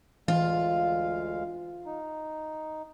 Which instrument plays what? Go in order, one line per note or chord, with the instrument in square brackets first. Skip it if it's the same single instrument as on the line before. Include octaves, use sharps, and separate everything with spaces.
[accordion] D2 G#3 F5 [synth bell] E3 [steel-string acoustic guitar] F4
[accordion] D#4